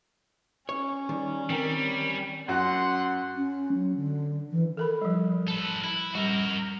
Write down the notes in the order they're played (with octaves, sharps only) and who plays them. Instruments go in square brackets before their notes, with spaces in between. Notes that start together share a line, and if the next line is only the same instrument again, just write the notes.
[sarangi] C#4 [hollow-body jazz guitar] C#5
[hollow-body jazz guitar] D#3 G3
[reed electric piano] D#3 A#4 [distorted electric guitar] G3 [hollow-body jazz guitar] C4
[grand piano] F#2 F#4 [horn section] F#5 C6
[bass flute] C#4
F#3
D3
E3
[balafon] A4 A#4 B5
F3 G3
[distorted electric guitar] A4 B4
E4
[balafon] G3 [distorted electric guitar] F#4 A#4